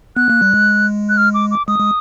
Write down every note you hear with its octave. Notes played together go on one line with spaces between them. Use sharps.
B3 F#6
A#3
G3
G#3
F#6
F6
D6
D6
G#3 D#6
G#3